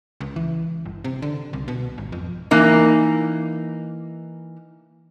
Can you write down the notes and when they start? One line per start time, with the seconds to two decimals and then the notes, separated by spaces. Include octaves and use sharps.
0.21 C#2
0.36 E3
0.86 G1
1.04 C3
1.22 D3
1.53 C2
1.68 B2
1.98 G#1
2.12 F2
2.51 E3 A#3 D#4